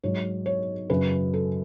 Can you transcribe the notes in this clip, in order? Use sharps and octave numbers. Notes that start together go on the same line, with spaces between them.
G#2 F#3 C#5
C#5
F#2 C#3 F#3 B4
A4